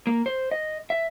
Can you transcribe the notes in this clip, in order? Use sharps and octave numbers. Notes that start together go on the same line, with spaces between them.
A#3
C5
D#5
E5